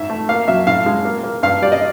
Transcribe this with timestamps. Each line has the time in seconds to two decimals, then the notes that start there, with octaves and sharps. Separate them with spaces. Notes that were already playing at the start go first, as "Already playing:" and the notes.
Already playing: G#2 E5
0.10 A3
0.29 A#3 F5
0.48 F#3 E5
0.67 A2 F5
0.86 G#3
1.05 A#3
1.24 A#3
1.43 G2 F5
1.62 G3 D5
1.72 D#5